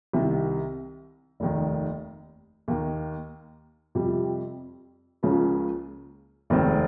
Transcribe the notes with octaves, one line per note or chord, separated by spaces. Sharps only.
C2 C3 D#3
F1 D#2 D#3
D#2 D#3 A#3
F2 C3 G3
C#2 C#3 F3 A#3 C#4
F1 D#2 D#3 G#3 C4